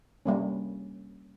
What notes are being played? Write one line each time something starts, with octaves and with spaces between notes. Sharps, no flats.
G3 A#3 C#4